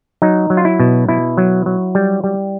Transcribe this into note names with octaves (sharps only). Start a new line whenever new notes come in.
F#3 D#4
F#3
F4
E4
B2
B2 E4
F#3
F#3
G3
G3